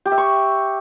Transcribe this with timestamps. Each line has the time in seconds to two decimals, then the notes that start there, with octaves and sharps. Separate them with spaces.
0.06 G4
0.12 E5
0.18 C#6